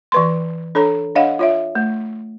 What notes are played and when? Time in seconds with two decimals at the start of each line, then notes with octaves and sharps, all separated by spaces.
0.12 E3 B4 C6
0.75 D4 A4 C#5 A#5
1.15 D4 C#5 D#5 F5 F#5
1.39 F4 C#5 E5
1.75 A3